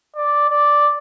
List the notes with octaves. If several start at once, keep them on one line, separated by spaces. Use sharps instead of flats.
D5
D5